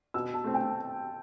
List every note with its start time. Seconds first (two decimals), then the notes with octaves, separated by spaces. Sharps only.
0.14 B2 E6
0.34 A5
0.44 A3 C4
0.54 G5